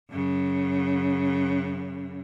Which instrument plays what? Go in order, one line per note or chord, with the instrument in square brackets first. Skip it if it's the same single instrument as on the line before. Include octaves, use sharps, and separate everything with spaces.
[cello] F#2 C#3